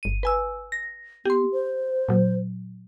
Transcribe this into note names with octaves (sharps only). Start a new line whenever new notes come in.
G1 D#7
B4 G#5 E6
A#6
B3 G4 C6
C5
A#2 F#3